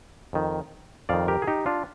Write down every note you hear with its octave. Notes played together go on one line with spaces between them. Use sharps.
F2 D#3
F2 D#3 D5 F5
G4 A#4
G#4
D#4 G4
D4 F4